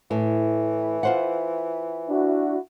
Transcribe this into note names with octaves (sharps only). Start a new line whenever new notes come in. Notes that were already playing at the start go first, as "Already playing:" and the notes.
A2 E3
F4 C5 F#5
D4 E4 F#4